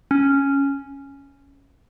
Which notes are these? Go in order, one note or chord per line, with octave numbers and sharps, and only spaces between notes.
C#4